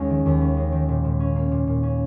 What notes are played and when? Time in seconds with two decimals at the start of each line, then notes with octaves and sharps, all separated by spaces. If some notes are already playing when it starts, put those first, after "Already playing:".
Already playing: D#2 G#3 C#4
0.10 D#3
0.26 D#2
0.41 C#4
0.57 G#3
0.72 D#3
0.89 A#2
1.04 A#2
1.20 C#4
1.35 A#3
1.51 A#2
1.67 A#2
1.83 C#4